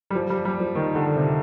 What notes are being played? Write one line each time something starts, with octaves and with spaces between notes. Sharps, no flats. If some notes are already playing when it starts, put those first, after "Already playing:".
G3
F3
G3
G3
F3
D#3
D3
C3